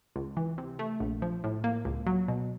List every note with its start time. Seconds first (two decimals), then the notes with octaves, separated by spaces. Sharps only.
0.16 C#2
0.37 E3
0.58 C3
0.79 A3
1.00 A#1
1.22 F3
1.44 A2
1.64 A#3
1.85 C#2
2.07 F#3
2.28 B2